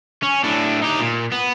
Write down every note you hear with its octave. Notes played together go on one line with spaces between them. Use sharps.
C#4
A2 D4
D#4 G4
A#2
B3